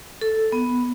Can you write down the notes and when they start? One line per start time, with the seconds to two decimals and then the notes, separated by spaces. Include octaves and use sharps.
0.21 A4
0.52 B3